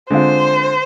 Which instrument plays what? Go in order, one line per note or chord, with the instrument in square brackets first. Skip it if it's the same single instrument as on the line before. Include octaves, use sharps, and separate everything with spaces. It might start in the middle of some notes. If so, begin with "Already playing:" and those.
[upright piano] D3 G#3 C4 F4 [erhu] C5